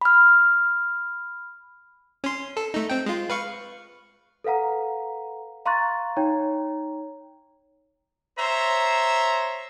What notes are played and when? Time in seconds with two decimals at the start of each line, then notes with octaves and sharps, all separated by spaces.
0.01 B5 F6
2.24 C#4 C6
2.57 A4
2.74 A3 D#4
2.90 C4 G5
3.06 G#3 F4
3.30 B4 F5 C#6
4.44 A4 B4 F5 F#5 A#5
5.65 F5 A#5 C6 C#6 F#6 A6
6.17 D#4 C#5 G5 A#5
8.39 C5 C#5 E5 A#5